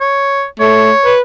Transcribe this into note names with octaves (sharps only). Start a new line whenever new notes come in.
C#5
A3 C#5
B4